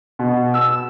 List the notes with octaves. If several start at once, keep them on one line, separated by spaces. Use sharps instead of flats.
B2
E6